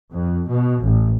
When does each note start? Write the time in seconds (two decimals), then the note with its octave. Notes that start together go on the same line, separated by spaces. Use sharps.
0.12 F2
0.49 B2
0.82 A1